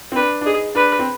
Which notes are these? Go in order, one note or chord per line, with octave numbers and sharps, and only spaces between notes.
C4
D4 B4
D4
D#4 G#4
D4 B4
C4